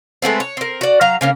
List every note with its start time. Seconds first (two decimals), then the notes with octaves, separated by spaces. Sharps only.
0.22 G#3 A3 B3 C4
0.40 C#5
0.57 C4 A#4
0.81 F#4 D5
1.01 F#3 F5 A#5
1.21 C#3 A#3 C#4